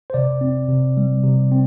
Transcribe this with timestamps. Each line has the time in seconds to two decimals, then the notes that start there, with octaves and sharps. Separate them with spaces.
0.10 C5
0.14 C3 D5
0.41 C4
0.69 C3
0.97 G3
1.24 C3
1.52 C4